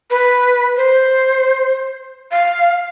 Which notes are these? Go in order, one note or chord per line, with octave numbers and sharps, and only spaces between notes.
B4
C5
F5